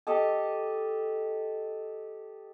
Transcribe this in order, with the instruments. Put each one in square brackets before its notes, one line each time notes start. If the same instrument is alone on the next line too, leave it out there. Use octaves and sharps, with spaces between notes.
[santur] G4 A4 D#5 A5